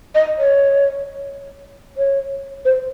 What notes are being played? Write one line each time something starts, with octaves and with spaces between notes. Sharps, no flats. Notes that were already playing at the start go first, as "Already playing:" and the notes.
D#5
C#5
C#5
C5